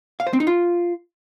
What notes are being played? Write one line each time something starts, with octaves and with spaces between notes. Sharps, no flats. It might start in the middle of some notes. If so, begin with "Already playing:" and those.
F5
C5
C4
D#4
F4